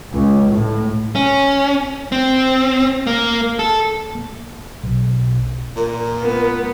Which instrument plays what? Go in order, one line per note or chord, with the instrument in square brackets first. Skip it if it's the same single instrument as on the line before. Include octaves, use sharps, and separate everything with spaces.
[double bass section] C#2
A2
[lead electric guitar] C#4
C4
A#3
A4
[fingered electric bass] A#3
B1
[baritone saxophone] A#2 [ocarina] A#4
[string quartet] B3